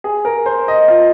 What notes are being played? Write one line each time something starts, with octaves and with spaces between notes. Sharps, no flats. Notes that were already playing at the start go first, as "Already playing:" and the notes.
G#4
A#4
C5
D#5
F4